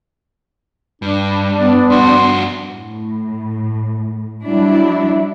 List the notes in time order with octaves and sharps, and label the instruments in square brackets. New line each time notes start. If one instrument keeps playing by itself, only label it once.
[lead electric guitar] G2 [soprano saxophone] D4
[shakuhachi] B3 [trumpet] D5
[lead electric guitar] G2 F#4 [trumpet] C6
[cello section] A2
F#3 G3 D4 E4